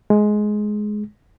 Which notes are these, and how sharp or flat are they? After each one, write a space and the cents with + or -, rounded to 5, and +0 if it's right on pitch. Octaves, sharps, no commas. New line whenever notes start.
G#3 +15